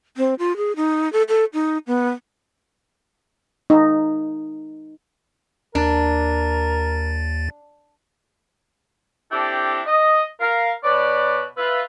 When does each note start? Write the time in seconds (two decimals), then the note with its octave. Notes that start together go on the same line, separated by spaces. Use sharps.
0.17 C4
0.39 F4
0.57 G#4
0.76 D#4
1.13 A4
1.28 A4
1.53 D#4
1.87 B3
3.70 D#4
5.75 D#2 D4 A#4 A6
9.31 C4 D4 E4 G4 A4 G5
9.86 D#5
10.40 A#4 F5
10.84 B2 B4 C#5 D5
11.57 F4 B4 E5